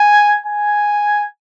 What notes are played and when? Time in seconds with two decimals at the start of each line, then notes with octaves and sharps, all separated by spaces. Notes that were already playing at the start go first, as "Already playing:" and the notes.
Already playing: G#5
0.46 G#5